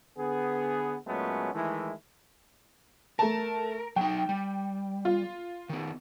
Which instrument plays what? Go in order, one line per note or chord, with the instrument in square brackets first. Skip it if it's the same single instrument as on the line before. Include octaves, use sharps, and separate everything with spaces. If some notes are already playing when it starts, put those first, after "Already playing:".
[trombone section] D3 B3 G#4
A#2 F#3 G#3 A3 B3 C#4
D#3 E3 G#3 A3 E4
[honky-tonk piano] A3 A5 [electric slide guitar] A#4
[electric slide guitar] F#3 D#4 [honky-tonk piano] G5
[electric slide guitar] G3
[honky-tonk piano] F4
[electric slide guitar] D#3 B3